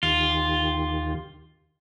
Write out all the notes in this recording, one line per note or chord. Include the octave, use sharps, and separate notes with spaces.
D#2 D#3 F4 G4